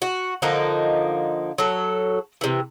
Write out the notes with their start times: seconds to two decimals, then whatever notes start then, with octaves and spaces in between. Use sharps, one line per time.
0.02 F#4
0.42 D3 F3 A#3 D#4
1.58 F#3 A4
2.41 C3 E3